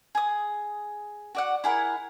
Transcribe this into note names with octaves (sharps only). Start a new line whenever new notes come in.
G#4 D#6
F#4 D5 F#5
E4 G#4 A#4 F#5